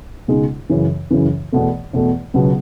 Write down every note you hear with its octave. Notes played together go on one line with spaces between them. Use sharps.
C#2 B2 G#3 D#4
F#2 C#3 E3
F#2 C#3 E3
E2 B2 A3
E2 B2 A3
C#2 B2 F#3 B3